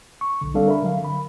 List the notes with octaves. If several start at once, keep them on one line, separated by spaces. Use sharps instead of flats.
C#6
B1 D3
G3 C4 D4 A4 D5 F5
A#4 E5 B5
D3 F#3 F5
B5